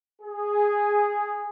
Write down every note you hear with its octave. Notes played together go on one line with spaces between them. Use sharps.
G#4